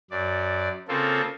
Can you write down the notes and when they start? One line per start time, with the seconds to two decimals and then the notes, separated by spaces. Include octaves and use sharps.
0.11 F#2 D5
0.88 C#3 A#3 C4 F4 A4